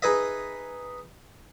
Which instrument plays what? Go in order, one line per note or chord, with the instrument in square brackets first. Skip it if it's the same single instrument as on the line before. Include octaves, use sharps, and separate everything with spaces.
[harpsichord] D#4 G#4 B4 D#5 E5